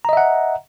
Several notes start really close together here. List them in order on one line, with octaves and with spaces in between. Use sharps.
A#5 D#5 E5 F#5